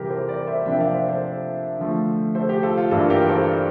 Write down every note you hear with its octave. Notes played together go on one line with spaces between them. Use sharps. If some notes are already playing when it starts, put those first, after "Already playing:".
Already playing: C3 E3 G3 C4 F4 G4 A#4
A4 C5
A#4 D5
C5 E5
C3 F3 A#3 D4 E5 G5
D5 F5
C5 E5
A4 C5
D3 F3 A3
A4 C5
G4
F4 A4
F4
G2 E3 A#3 D4 F4 A4
G4 A#4
A4 C5